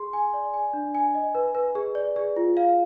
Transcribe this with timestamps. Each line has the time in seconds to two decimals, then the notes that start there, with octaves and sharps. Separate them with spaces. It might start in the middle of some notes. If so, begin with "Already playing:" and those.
Already playing: G#4 C6
0.13 G#5
0.33 D5
0.54 G#5
0.73 D4
0.95 G#5
1.15 D#5
1.35 B4
1.55 B4
1.75 G#4
1.95 D5
2.16 G#4
2.36 F4
2.57 F5